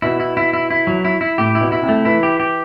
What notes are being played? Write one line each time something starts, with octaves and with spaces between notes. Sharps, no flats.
B2 E4
E4
E4
E4
E4
F#3
E4
E4
A2 G4
E4
B2
E4
C3
A3
E3 E4
G4
G4